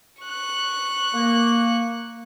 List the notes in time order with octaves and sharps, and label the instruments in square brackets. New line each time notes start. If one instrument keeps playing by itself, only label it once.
[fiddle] C#6 F#6
[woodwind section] A#3